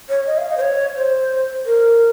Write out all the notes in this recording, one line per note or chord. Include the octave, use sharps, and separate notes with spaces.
C#5
D#5
F5
D#5
C5
C#5
C5
A#4